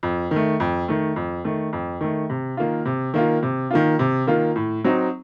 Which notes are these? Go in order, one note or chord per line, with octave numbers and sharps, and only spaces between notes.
F2
D#3 A3
F2
D#3 A3
F2
D#3 A3
F2
D#3 A3
C3
D#3 A#3 F4
C3
D#3 A#3 F4
C3
D#3 A#3 F4
C3
D#3 A#3 F4
A2
F#3 C4 D#4